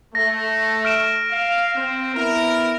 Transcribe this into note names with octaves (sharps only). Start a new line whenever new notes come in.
A3 A#6
F6 D7 E7
F5
C4
B3 E4 A#4